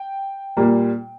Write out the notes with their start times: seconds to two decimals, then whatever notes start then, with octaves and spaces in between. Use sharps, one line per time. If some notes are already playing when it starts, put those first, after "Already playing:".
Already playing: G5
0.57 A#2 G3 A#3